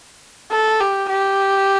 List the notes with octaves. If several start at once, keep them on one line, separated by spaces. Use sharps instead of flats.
A4
G4
G4